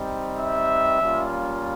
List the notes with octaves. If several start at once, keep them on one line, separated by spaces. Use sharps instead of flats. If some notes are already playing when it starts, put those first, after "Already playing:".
Already playing: G3 C4 D#4
E5
G3 A#3 C#4 F4